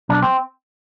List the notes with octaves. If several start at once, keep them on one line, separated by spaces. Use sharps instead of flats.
B1 D4
C4